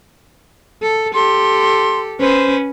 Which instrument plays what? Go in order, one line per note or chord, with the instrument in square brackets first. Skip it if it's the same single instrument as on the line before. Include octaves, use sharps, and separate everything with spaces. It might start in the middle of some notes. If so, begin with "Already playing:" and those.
[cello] A4
[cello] G4 A4 [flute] C6
[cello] C#4 B4 [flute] C5